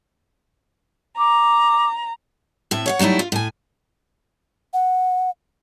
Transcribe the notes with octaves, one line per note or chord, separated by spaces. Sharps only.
A#5 D6
A2 C4 E5
C#5 F5 F#5
F#3 G3 A3 D#4 E4
F4
A2 G#5
F#5